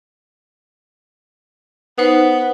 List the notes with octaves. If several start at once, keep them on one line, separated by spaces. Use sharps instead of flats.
B3 D#4 C5